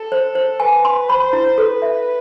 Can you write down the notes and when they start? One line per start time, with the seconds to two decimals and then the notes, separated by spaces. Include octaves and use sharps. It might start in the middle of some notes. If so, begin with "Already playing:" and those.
Already playing: A4
0.12 C5
0.35 C5
0.60 B4 G#5
0.85 C6
1.09 C5 B5
1.33 E4
1.57 A4 B4
1.82 E5